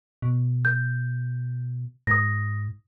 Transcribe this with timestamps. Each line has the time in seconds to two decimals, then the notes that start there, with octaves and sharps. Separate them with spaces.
0.22 B2
0.65 G6
2.07 G#2 D#6 A#6